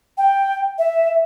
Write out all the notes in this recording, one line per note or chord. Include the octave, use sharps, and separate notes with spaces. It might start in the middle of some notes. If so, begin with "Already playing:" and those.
G5
E5